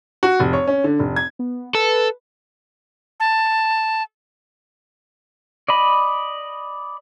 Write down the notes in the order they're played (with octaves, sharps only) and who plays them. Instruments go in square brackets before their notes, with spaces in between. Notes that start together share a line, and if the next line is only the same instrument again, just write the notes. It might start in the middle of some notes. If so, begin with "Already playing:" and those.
[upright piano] F#4
F1
C#5
C#4
D3
F1
G#6
[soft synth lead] B3
[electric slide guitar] A4 [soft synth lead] B4
[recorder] A5
[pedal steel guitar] D5 D#5 B5